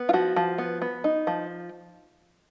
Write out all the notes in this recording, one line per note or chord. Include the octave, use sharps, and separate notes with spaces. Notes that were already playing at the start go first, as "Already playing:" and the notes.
Already playing: B3
F4
F3 F#4
F3
B3
B3
D#4
F3